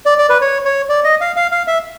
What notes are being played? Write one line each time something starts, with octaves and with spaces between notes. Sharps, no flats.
D5
D5
B4
C#5
C#5
D5
D#5
F5
F5
F5
E5